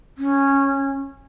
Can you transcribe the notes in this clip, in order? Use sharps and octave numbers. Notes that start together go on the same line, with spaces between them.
C#4